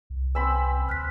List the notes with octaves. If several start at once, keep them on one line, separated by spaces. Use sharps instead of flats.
C2
C4 B4 G#5 B5 E6
D2 F6 F#6 B6